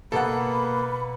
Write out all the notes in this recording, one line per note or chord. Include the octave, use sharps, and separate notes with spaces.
B2 A#3 A4 F#5 B5